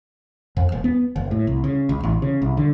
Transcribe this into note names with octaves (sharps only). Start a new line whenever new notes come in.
F2
D#1
B3
F#1
A2
C2
C#3
C#2
A1
C#3
C2
D3